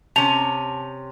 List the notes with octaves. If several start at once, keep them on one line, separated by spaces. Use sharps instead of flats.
C3 C#4 A5 F7